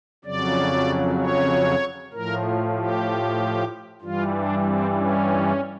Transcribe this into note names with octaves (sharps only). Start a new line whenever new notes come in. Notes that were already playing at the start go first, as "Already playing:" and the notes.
F2 C#3 F#3 D5
C#5
A2 F3 A#4
G4
G2 E3 G3 F4
D4
C4
C#4